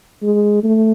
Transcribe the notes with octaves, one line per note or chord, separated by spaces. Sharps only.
G#3
A3